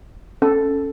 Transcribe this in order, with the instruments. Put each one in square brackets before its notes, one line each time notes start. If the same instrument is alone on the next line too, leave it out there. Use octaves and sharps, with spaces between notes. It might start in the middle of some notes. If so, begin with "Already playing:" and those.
[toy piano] C#4 [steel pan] A4